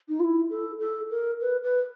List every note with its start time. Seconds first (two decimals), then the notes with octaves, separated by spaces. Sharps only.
0.08 D#4
0.19 F4
0.23 E4
0.50 A4
0.79 A4
1.10 A#4
1.41 B4
1.63 B4